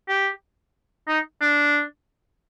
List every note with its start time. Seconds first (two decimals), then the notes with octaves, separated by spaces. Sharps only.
0.08 G4
1.08 D#4
1.41 D4